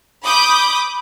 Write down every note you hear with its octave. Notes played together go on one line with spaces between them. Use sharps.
B5 D6 D#6 G6